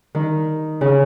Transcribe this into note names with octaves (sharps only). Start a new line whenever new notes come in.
D#3
C#3